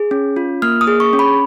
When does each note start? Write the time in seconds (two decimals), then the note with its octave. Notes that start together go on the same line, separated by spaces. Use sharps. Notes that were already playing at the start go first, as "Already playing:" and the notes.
Already playing: G#4
0.11 C#4
0.36 F4
0.62 A#3 F6
0.81 D#6
0.87 G#4
1.00 C#6
1.13 C#4
1.19 B5